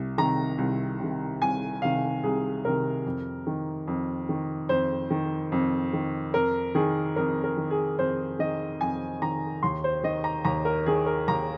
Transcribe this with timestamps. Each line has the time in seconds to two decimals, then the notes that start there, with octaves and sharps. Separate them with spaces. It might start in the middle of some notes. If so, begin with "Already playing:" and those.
Already playing: C2
0.18 C3 D#3 A#5
0.58 C2
1.00 C3 D#3
1.42 C2 G#5
1.82 C3 D#3 F5
2.24 C2 G#4
2.65 C3 D#3 A#4
3.06 F2
3.47 D#3
3.87 F2
4.29 D#3
4.69 F2 C5
5.10 D#3
5.52 F2
5.93 D#3
6.34 F2 A#4
6.75 D#3 G#4
7.16 F2 A#4
7.44 A#4
7.57 D#3
7.71 G#4
7.98 F2 C5
8.39 D#3 D#5
8.81 F2 G#5
9.22 D#3 A#5
9.63 D#2 C6
9.84 C5
10.03 D#3 D#5
10.24 A#5
10.45 D#2 A#5
10.65 A#4
10.86 D#3 G#4
11.06 A#4
11.28 D#2 A#5